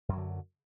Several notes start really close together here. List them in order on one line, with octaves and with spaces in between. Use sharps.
F#2 F#3 D3